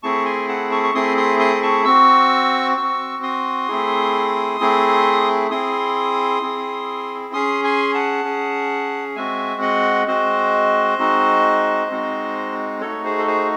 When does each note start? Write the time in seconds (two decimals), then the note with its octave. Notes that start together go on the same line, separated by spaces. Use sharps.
0.03 A3 C4 E4 G#4 A5 C#6
0.25 G#5 C6
0.49 F#5 A5
0.71 A5 C#6
0.83 C#6
0.94 A3 C4 E4 G#4 C6 D#6
1.17 C6 D#6
1.39 C6 D#6
1.55 C6
1.63 A5 C#6
1.85 C4 F#4 C#6 E6
2.77 C4 F#4 C#6 E6
3.23 C6 D#6
3.68 A3 C4 E4 G#4
4.60 A3 C4 E4 G#4
5.51 C4 E4 G#4 C6 D#6
6.42 C4 E4 G#4
7.33 C#4 G#4 C6 D#6
7.64 G#5 C6
7.94 F#5 A5
8.24 C#4 G#4
9.16 G#3 C4 F#4 E5 G#5
9.61 D#5 F#5
10.07 G#3 C4 F#4 C5 D#5
10.99 G#3 C4 D#4 F#4
11.91 G#3 C4 D#4 F#4
12.81 A3 D#4 F#4 A4 C#5
13.04 G#4 C5
13.18 A4
13.27 G#4 C5